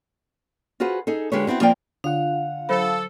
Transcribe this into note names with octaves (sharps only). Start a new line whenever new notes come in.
F4 F#4 G#4 B4 C5
D#4 G#4 A4
D3 G#3 F4 G4 B4 C#5
B3 C4 E4 F#4
F3 A#3 C4 F4 D5 G5
D3 D4 F4 F5 F#5
F#3 A4 C5 B5